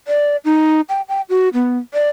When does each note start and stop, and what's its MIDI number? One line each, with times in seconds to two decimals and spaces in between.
0.07 0.36 74
0.45 0.81 63
0.89 1.02 79
1.09 1.21 79
1.30 1.49 66
1.54 1.78 59
1.94 2.09 74